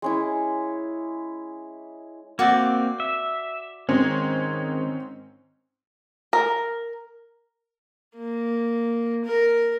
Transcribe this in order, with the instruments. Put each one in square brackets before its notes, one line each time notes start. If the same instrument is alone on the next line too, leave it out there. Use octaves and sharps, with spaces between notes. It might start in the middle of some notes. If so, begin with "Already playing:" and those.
[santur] G#3 C#4 E4
[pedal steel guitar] A#3 C4 [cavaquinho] F#4 D5
[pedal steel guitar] E5
[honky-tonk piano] G#2 C4 C#4 [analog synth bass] D#3 [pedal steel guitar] G#3
[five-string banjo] A#4
[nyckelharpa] A#3
A#4